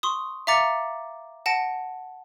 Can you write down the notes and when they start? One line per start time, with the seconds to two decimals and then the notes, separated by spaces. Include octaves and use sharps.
0.03 C6 C#6 D#6
0.47 E5 F5 A#5 D6 A6 C#7
1.46 F#5 A5 A#6 D7